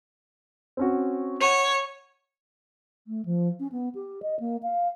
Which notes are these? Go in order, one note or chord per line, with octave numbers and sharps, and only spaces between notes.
C4 C#4 F#4
C#5 F#5 D#7 F7
A3
F3
C#4
B3
G4
D#5
A#3
F5